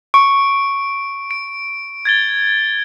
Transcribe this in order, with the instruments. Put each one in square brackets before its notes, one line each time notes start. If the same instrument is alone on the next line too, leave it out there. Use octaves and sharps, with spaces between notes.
[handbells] C#6 [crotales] D7
[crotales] D7
G#6 A6 G7